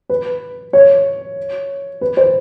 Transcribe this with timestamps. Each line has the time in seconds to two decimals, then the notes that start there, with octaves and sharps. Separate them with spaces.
0.09 B4
0.73 C#5
2.01 B4
2.17 C5